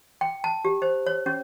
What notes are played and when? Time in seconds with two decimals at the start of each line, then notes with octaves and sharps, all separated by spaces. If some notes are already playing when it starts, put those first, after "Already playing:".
0.21 G5
0.44 A5
0.65 G4
0.82 C5
1.06 C#5
1.26 C#4